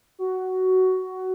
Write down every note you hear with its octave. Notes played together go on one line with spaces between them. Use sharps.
F#4